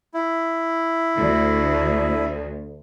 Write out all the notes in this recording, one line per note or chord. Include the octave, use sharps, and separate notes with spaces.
E4
D2